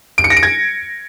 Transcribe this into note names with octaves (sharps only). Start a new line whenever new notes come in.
D7
C#7
A#6
D7
G#6